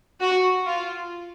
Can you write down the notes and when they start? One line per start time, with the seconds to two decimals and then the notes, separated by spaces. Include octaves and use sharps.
0.20 F#4
0.66 F4